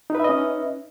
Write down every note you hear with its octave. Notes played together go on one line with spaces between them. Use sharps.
C#4 D#4 B4 D#5 E5